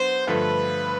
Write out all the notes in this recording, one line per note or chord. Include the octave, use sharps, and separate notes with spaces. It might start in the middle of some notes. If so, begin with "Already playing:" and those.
Already playing: F#3 B3 D4 F#4 C5
G2 D3 F3 A3 B4